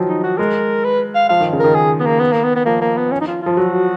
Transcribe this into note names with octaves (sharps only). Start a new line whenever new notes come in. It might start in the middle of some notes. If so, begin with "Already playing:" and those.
Already playing: D#3 F3 F#3
D#4
F#4
G#3 A#4
B4
F5
F3 F5
D#3
C#3
D#3 A#4
G#4
B3
A#3
B3
A#3
B3
B3
F3 A#3
A#3
B3
C#4
D#4
F4
F3 F4
F#3 F#4